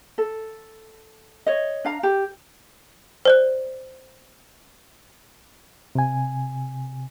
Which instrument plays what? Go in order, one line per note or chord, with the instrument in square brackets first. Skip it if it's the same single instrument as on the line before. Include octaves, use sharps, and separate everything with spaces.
[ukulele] A4
C#5 D#5
D4 F5 A#5
G4
[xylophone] C5 D5 F#6
[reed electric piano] C3 G#5